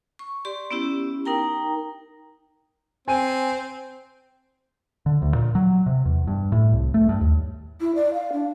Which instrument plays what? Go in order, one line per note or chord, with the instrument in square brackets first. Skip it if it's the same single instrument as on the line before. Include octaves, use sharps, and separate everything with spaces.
[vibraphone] C#6
G4 D5 C6
B3 C#4 E4 G4
D#4 A#4 G5 A#5
[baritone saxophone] C4 [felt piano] G#5 D#7
[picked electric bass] D3
D2
A#2
F#3
C3
E2
G2
A2
C2
A3
G2
D#2
[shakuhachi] E4
D5
F5
D4